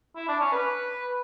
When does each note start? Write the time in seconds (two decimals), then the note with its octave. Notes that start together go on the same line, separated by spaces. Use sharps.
0.16 E4
0.28 D4
0.40 C#4
0.52 B4